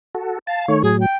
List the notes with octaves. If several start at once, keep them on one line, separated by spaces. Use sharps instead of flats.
F#4 A4
F5 A5
D#3 A3 C#5
A2 F#3 G#4
G5